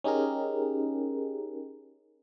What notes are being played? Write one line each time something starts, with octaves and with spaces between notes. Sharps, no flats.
C#4 D#4 G4 G#4 A#4